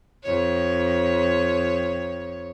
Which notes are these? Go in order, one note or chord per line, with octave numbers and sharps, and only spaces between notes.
F2 C#5